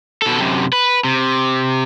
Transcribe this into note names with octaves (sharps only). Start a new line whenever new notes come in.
B2 A4
F#2 C3
B4
C3